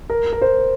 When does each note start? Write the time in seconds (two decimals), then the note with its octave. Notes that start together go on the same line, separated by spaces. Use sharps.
0.10 A#4
0.33 A#4
0.42 C5